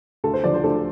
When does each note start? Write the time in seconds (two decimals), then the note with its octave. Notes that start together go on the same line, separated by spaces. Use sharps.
0.24 D2 A4
0.34 C5
0.44 D3 F3 D5
0.54 C5
0.64 D2 A4